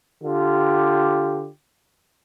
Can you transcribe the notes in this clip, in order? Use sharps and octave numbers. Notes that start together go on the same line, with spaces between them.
D3 F4 G4